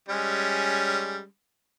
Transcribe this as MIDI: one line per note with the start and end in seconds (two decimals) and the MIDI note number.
0.09 1.24 55
0.09 1.24 56
0.09 1.24 61